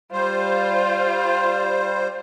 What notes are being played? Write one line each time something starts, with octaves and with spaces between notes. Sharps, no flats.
G3 F4 C5